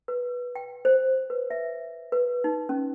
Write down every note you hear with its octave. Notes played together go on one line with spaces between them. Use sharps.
B4
G5
C5
B4
E5
B4
D#4
C#4